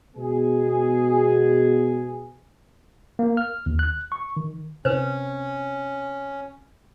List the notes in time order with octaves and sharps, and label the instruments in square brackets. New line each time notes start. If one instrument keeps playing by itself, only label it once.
[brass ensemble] B2 G#3 B3 G#4
[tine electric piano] A#3
F6
D#2
F#6
C#6
D#3
[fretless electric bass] C3 [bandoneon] C#4 [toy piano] B4 C5